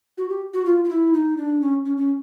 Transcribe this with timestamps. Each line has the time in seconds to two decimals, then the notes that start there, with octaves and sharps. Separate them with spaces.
0.18 F#4
0.29 G4
0.54 F#4
0.65 F4
0.84 F4
0.89 E4
1.14 D#4
1.37 D4
1.61 C#4
1.85 C#4
1.97 C#4